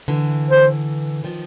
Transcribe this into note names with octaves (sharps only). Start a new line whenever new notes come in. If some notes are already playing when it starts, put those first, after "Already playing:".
D3 E3
C5
D#3 F3